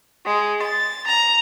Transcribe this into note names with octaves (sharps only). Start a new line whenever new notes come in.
G#3
A6
A#5